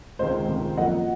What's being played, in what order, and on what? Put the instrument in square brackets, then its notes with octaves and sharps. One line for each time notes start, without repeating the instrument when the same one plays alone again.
[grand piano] C#2 C3 D#3 G#3 C5 D#5
C#2 C3 D#3 G#3
F#2 F3 A#3 D#5 F#5